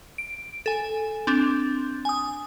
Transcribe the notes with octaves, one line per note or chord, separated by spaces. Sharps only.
D7
A4 G#5
C4 D4
G#5 D#6